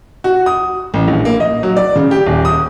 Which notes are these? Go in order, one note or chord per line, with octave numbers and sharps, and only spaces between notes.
F#4
D#6
A1
A#1
A#3
D#5
F#3
D5
C#3
G4
D#1
D#6